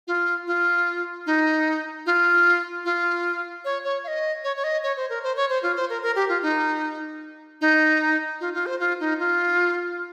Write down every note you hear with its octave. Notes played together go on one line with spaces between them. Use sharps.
F4
F4
D#4
F4
F4
C#5
C#5
F5
D#5
C#5
C#5
D#5
C#5
C5
A#4
C5
C#5
C5
F4
C5
A#4
A#4
G4
F4
D#4
D#4
F4
F4
C5
F4
D#4
F4